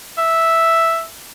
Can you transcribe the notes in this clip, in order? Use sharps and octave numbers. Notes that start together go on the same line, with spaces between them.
E5